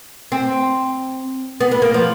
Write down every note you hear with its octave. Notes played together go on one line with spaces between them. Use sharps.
C4
B3
B3
A#3
F3